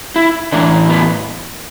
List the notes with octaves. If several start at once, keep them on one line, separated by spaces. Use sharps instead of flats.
E4
A2 E3 D4
B3